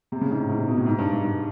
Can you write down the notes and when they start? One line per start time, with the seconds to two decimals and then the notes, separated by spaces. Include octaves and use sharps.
0.12 C3
0.21 C#3
0.30 G#2
0.40 A2
0.49 G#2
0.59 C3
0.68 B2
0.77 A2
0.86 G#2
0.98 G2
1.11 G#2
1.24 G2